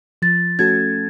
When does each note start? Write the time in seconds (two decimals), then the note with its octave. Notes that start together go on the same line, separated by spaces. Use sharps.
0.22 F3 A6
0.59 A3 C#4 F#4 A4 G#6